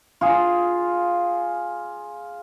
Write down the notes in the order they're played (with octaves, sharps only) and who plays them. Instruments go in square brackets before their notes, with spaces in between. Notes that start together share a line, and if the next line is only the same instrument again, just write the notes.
[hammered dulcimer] F4 G#4